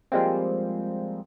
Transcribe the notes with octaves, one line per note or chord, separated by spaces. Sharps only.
F3 G3 G#3 A#3 C4